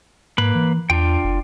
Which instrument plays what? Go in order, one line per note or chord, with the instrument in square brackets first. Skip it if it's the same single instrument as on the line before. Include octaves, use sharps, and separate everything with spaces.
[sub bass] G#2 [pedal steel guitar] A#3 B4 B5
[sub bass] E3
[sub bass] E2 [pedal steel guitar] D4 F4 G5
[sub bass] F#1